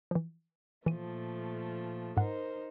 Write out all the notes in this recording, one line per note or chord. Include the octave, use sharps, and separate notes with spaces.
E3 F3
A#2 E3 F3 A3 D#7
G#2 D#4 A#4 C5 F#5